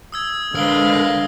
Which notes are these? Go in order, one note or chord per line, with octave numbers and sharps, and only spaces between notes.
D#6 E6 G#6
D3 G#3 A#4 B4 F5 D#6 F#7 G7
A#6